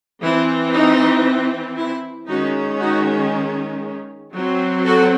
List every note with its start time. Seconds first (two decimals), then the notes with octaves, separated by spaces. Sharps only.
0.22 E3 C4 E4
0.73 D#4
1.77 E4
2.28 D#3 G#3 C#4 D#4 F#4
2.79 D#4 F#4
4.34 F#3 C4
4.85 F#4 A4